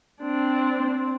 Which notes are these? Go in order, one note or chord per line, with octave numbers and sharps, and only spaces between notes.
C4 D4